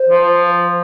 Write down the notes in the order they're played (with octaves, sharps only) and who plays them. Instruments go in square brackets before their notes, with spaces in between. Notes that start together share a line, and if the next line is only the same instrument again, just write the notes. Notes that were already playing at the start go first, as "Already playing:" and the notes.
Already playing: [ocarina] C5
[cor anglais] F3